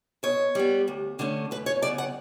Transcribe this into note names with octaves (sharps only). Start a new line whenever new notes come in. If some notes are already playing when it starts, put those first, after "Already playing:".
B2 C#5
G3 B3
D2
D3 A3 C#4
F#2 B4
C#5
C#3 F#3 B3 D5
F#5